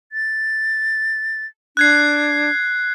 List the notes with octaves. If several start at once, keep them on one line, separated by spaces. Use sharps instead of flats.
A6
D4 F#6 G#6 C7